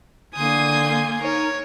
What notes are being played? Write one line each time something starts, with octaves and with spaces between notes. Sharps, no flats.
D3 A#3 G#5 C6 D#6 G6
D#4 A#4 C#5